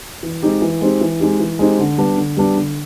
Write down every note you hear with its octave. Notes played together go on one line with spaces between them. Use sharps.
E3
G#3 C4 D#4 G4
E3
G#3 C4 D#4 G4
E3
G#3 C4 D#4 G4
E3
G#3 C4 D#4 G4
D3
G3 B3 D4
D3
G3 B3 D4
D3